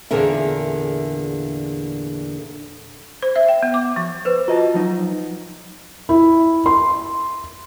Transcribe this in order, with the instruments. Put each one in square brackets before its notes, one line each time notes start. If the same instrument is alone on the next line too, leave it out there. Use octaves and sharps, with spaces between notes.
[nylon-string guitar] E2 A#2 D3 G#4 A#4 E5
[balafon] C5
E5
G5
B3
D6
F3
[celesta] B4 C5
[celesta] F4 [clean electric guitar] F#4 D#5 A5
[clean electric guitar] F3 F#3 D#4
[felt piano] E4
C6